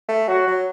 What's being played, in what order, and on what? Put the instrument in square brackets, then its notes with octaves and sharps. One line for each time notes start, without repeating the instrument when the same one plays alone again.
[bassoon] A3
[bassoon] F#3 [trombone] F#4
[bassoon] F#3